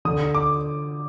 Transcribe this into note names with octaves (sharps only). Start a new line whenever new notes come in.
D3 D#6
D6